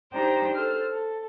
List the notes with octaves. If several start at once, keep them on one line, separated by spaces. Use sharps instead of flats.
D4 D#4 G4 C5 G5 A#5
A4 C5 F6
A4